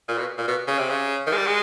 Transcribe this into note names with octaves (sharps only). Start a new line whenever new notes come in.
A#2
B2
A#2
B2
C#3
C3
C#3
D#3
G#3
G3
G#3